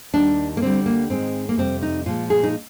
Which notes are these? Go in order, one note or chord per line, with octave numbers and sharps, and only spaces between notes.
D#2 D#3 G3 D4
A#3
D2 D3 G3 C4
A#3
G#2 D#3 G#3 C4
A#3
F2 C3 G3 C4
D#4
A#2 F3 G#3 F4
G#4
D#4